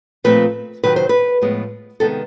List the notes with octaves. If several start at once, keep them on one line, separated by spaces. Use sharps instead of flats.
A#2 F3 A3 C4 B4
C3 D#3 F#3 B4
C5
B4
A2 F3 G#3 B3
C3 D#3 G#3 B3 A4